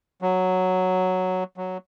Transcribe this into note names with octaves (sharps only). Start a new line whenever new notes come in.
F#3
F#3